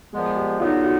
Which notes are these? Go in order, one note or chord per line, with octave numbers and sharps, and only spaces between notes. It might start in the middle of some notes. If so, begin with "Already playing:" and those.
A#2 F3 G#3 B3 G#4
G4
D3 F#3 B3 D#4 F4
F#4